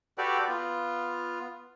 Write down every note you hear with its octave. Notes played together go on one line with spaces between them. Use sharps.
F#4 G4 A4 B4 D5 G5
B3 F4